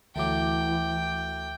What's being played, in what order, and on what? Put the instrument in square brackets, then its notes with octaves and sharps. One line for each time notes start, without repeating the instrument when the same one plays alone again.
[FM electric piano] D2 D6 [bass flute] E3 [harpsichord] F#3 A3 [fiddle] G5